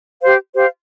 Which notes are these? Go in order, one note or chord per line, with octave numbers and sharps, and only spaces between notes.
G4 C5 F5
G4 C5 F5